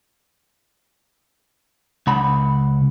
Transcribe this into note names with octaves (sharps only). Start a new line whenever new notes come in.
C#2 F#5 B5